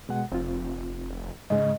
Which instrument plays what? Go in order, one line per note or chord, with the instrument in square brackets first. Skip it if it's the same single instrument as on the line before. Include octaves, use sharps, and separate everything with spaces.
[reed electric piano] B2 G#3 F#5
[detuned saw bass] F1 [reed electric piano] C4 F4
[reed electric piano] G#2 G#3 [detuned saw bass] C#3 [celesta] D#5